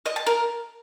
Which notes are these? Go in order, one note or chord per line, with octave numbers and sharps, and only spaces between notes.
D#5
A5
A#4